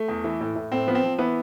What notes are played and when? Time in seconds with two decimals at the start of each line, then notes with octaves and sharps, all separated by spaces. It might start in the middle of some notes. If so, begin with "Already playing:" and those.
Already playing: A3
0.08 E2
0.24 E3
0.41 A2
0.56 A2
0.72 A2 C4
0.87 F3 B3
0.95 C4
1.04 F3
1.19 E3 B3